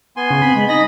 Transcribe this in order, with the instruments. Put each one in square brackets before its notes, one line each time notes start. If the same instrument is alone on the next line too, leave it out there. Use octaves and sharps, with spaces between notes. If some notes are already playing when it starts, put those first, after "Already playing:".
[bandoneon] B3 G#5 C6
[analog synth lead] C#3
[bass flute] C4 [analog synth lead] B5
[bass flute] G#3
[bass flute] D#4 [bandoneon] D#5 B5 [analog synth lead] A#6